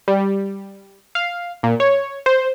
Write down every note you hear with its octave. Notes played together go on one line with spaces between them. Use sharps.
G3
F5
A#2
C#5
C5